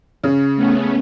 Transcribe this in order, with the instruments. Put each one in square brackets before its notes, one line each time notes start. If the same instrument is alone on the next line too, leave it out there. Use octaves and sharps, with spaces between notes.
[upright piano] C#3
[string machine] A3 B3 C#4